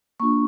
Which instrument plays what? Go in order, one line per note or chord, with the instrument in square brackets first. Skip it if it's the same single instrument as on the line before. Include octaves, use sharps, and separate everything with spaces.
[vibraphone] A#3 D4 F4 C#6